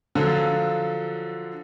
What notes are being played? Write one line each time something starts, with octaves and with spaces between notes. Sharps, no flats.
D3 F3 F#3 F4 A4